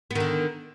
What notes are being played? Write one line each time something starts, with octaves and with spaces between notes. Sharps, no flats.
D3 D#3 B3